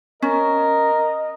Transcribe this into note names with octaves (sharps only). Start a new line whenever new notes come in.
C#4 A#4 D#5